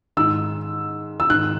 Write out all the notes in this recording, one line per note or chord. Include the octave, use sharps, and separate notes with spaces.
G#2 D#3 E6
E6
G#2 D#3 F#6